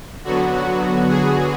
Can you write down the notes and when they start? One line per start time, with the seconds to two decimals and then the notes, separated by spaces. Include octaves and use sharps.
0.24 D3 F#3 B3 F#4
0.53 F#4
1.09 G#4